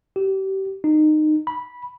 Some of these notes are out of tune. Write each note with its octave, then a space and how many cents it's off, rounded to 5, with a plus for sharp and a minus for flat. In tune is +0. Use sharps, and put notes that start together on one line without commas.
G4 -30
D#4 -20
B5 -10